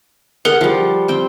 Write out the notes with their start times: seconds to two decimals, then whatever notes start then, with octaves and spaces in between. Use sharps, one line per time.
0.45 G#4 A#4 F#5
0.61 F3 G3
1.08 C4 G5